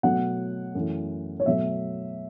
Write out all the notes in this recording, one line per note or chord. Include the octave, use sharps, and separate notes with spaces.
B2 F#3 A3 F#5
F#2 E3 A3
C#5
B2 F#3 A3 E5